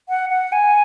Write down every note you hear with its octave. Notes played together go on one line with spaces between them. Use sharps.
F#5
F#5
G#5